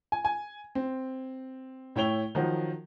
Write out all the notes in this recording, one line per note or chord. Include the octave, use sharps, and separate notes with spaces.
G#5
G#5
C4
A2 E4 C#5 G5 F7 G7
D#3 F3 F#3 F#4